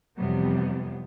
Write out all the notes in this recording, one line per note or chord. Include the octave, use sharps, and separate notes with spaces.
F2 C3 E3 F#3 G3 B3